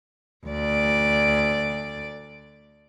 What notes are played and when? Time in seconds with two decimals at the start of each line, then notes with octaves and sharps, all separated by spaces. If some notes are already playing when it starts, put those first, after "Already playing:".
0.47 D2 D5